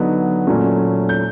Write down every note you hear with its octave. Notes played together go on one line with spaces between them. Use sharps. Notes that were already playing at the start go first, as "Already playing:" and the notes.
Already playing: D3 F#3 B3 D#4
A#2 F#3 A3 C#4
G6